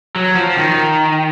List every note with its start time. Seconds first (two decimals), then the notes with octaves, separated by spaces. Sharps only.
0.16 F#3
0.36 F3
0.56 D#3